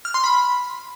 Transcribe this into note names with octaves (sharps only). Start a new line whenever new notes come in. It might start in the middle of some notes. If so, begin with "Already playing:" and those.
F6
C6
B5